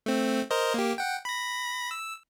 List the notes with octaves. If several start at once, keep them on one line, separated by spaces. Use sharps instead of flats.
A3 C4
A#4 C5 D#5
A#3 G4
F#5 G5
B5 A#6
E6